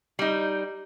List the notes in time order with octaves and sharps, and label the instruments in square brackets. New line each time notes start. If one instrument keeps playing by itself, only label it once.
[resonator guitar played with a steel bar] G3 D#4